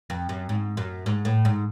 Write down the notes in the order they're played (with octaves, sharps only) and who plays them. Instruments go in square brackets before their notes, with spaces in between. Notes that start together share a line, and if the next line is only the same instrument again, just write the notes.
[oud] F2
F#2
G#2
F#2
G#2
A2
G#2